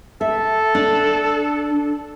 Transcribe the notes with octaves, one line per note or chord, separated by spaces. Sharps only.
A4 E5
D4